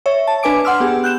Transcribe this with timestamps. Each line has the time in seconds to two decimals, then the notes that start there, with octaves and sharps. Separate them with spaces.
0.06 C#5 E5
0.27 A5
0.43 D4 B4 G#5 D6 D7
0.65 F#5 C6 E6 F6
0.80 B3 G4 G#4
1.04 F#6 G6 E7